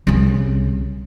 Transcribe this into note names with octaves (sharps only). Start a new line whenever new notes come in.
C2 C#3